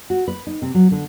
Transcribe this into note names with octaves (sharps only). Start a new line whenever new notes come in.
F#4
B4
D#4
C3
F#3
D3